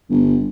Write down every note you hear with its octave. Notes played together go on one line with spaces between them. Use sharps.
G1